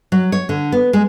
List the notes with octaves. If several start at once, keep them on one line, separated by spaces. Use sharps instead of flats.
F#3
C#5
D3
B3
G#3